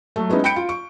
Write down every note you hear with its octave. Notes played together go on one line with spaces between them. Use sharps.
F#3 A3
G#3 B3 C#4 D#4 E4
G5 B5 G6 C#7 D7
F4
C#6